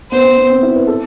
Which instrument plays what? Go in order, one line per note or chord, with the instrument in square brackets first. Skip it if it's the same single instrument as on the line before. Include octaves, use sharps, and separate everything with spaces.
[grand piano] B3 [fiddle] C5
[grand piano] B3
B3
C4
E4
B4
A4